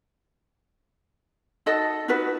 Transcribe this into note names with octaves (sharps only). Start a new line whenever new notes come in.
D#4 F#4 A4 D#5
D#4 F4 F#4 B4